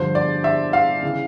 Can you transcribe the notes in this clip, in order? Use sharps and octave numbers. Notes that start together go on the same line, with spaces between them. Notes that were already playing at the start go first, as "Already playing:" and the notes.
Already playing: G2 D3 F3 C5
D5
E5
F5
C#3 E3